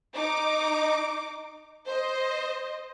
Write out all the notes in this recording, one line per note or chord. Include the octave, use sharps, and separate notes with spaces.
D#4 D6
C5 D#5